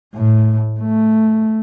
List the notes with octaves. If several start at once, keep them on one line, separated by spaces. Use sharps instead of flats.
A2
A3